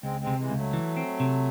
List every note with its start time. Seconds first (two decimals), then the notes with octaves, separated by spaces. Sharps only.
0.03 C#2 G#3 C4
0.21 G#3 C4
0.27 C3
0.38 E3 G#3
0.50 C#2
0.56 F#3 A3
0.73 E3
0.97 C4
1.20 C3